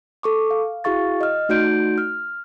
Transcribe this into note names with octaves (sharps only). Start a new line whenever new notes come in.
A4 C#6 D6
F5
E4 F#4 G#4 F5 C#6 A6
D#5 F6
A3 D#4 F#4 D5 G6 D7
F6